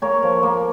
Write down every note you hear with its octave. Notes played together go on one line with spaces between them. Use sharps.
A#3 A#4 C#5
F3
A#3